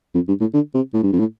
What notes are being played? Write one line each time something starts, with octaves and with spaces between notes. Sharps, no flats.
F2
G2
A2
D3
C3
A2
G2
F2
A2